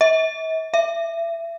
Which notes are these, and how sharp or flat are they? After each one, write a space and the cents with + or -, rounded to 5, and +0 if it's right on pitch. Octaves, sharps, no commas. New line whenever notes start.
E5 -45
E5 +25